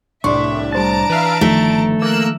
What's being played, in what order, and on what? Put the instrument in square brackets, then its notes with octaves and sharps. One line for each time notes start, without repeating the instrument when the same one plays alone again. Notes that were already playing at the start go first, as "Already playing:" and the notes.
[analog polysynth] C2 A2 [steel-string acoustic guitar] D4 [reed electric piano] D5 C6 C#6 [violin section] E5
[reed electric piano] G3 C5 A6 [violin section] A5 A#5 D7
[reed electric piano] E3 [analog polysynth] B4 E5 F5
[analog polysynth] G1 [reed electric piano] D#3 F3 [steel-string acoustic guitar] A3
[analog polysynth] A#3 A#4 [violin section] E6 F#6